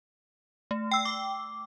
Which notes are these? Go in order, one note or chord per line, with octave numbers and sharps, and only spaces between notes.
A3
G5 E6
D6